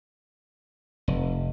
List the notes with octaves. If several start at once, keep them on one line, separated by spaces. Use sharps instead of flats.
F1